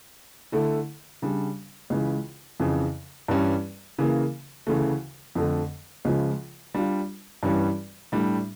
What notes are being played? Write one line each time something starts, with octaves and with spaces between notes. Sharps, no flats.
D3 A3 E4
C#3 G3 D4
C#2 C#3 E3
F2 C#3 E3
G2 E3 G3 C#4
C#3 E3 A#3
D2 C#3 E3 A3
F2 D3 A3
C#2 C#3 F3
G3 D4 F4
G2 E3 G3 C#4
A2 G3 D4